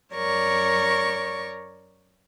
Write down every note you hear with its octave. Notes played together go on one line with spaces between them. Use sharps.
F#2 A#4 C#5 D5 C#6